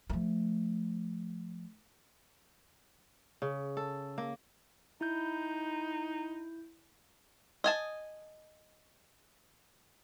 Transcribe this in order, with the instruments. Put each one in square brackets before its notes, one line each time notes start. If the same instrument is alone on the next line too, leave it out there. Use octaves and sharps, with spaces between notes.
[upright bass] F3 A3
[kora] C#3
A4
A#3
[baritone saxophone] D#4 [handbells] E4 G6
[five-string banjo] D#5 G#5 A5